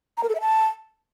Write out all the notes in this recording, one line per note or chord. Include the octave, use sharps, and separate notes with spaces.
A#5
A#4
A4
E5
A5